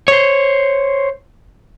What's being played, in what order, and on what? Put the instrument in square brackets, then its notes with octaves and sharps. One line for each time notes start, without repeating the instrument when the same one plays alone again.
[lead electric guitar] C5 C#5